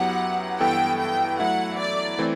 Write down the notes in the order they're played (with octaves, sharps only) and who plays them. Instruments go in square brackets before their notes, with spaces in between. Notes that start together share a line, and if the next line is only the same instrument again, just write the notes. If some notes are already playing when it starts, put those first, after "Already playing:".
Already playing: [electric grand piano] F#2 F#3 B3 E4 G4 [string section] F#5
[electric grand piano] G2 E3 B3 E4 A4 [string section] G5
[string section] G5
[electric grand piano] F#3 A3 E4 [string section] F#5
[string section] D5
[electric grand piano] E3 A3 C4 E4